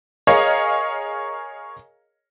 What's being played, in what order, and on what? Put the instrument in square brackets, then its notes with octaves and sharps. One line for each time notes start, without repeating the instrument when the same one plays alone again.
[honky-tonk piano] G#4 A#4 C#5 D#5 F5 A#5